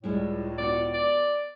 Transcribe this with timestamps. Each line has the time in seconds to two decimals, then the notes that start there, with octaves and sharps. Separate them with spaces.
0.04 C#2 A2 G3 G#3 E4
0.58 B3 D4 F#4 D5
0.93 D5